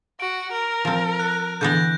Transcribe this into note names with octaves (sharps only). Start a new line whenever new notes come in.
F#4 D7
A#4
F3 C4
F#6
D3 E3 B3 G6 A#6